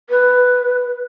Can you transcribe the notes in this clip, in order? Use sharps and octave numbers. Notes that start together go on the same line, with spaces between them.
B4